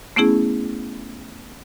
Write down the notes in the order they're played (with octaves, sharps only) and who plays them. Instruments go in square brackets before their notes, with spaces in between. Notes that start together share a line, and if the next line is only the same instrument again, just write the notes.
[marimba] A3 B3 C#4 E4 G#4